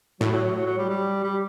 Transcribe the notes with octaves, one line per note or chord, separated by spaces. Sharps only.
A2 F#3
F#3
F#3
F#3
F#3
G3
G3
G3